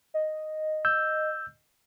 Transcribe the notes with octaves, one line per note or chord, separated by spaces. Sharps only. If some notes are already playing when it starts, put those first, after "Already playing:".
D#5
E6 G6